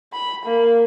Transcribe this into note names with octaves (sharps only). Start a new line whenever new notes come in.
B5
A#3